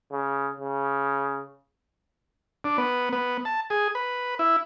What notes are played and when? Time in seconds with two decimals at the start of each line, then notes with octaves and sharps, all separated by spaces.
0.12 C#3
0.60 C#3
2.64 D4
2.78 B3
3.13 B3
3.45 A5
3.70 G#4
3.95 B4
4.39 E4